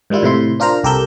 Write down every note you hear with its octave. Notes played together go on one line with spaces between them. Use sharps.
G#2 D#3 G3 E4 F4
A2 C3 E4 C6
D4 F4 A#4 C5 A#5
C2 G4 A4 A#4 E6 G6